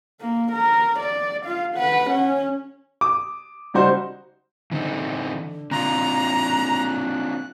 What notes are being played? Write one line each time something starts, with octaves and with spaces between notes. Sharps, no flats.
A#3
A#4
D5
F4 F5
B4 F#5
C#4
D6 D#6
C#3 G3 D#4 F#4 C5
D3 E3 C4 D#4
C4 D4 F4 A#5 F#6